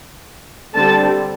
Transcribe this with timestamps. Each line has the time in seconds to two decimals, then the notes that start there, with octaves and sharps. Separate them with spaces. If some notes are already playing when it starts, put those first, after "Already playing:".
0.74 D3 G3 C4 A5